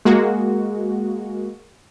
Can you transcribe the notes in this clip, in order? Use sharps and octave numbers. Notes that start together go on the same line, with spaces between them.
G#3 A#3 F#4